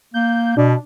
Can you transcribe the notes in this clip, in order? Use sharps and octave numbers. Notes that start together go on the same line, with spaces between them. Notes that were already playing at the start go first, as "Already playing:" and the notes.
A#3 G6
B2 D4